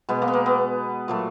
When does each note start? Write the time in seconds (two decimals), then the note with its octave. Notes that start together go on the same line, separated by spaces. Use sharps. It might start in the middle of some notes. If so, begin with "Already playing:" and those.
0.09 B2 G#3 B3
0.22 A#3
0.28 B3
0.33 A#3
0.46 B3
1.08 A#2 F#3 A3